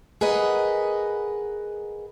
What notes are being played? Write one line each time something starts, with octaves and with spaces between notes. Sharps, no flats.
G#4 A#4 B4 D#5 F#5